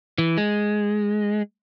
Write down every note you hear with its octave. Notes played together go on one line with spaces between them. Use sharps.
E3
G#3